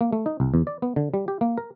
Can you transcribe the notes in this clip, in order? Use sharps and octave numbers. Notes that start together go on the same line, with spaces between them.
A#3
A3
D#4
C2
E2
D5
B3
D3
G3
G4
A#3
A#4